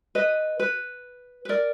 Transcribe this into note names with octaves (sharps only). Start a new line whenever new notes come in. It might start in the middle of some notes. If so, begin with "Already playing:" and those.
B4 D#5
B4
B4
A#4 D5